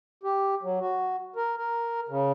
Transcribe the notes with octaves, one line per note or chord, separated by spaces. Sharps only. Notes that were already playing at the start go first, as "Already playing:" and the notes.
G4
F#3
F#4
A#4
A#4
C#3